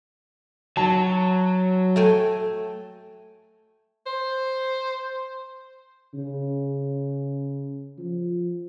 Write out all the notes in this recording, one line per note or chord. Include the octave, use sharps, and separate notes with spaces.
F#3 A5
A3 G5 G#5
C5
C#3
F3